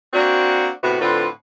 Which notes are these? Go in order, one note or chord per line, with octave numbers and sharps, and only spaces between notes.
A#3 C4 D4 F#4
A2 C3 B3 F#4
A2 D3 C4 F4 B4